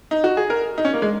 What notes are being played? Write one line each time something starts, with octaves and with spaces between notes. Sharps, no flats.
D#4
F#4
G#4
A#4
D#4
C#4
A#3
G#3